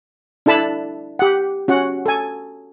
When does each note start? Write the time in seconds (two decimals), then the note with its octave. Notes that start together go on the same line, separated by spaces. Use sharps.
0.46 D4 E4 A4 A5 B5
1.19 G4 F#5
1.68 C#4 F#4 F#5
2.06 A4 G#5